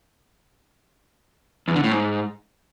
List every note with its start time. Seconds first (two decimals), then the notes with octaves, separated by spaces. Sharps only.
1.68 E2
1.76 D3
1.84 A2
1.92 G#2